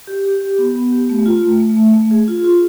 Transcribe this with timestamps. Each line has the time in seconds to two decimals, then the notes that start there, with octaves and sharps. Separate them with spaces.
0.07 G4
0.25 G4
0.41 G4
0.59 B3
0.75 B3
0.92 G4
1.09 A3
1.26 F4
1.43 A3
1.60 A3
1.77 A3
1.94 A3
2.11 G#4
2.28 F4
2.45 F4